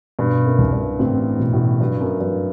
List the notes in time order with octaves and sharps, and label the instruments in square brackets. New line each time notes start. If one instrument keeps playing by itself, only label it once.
[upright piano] G2 [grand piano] B2
[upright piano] F#2
[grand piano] C2
[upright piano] G2
[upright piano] A1 A2 [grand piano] C4
[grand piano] B2
[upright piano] A1 A2
[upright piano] G2 [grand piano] F#3
[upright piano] F#2
[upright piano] G2 [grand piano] F#3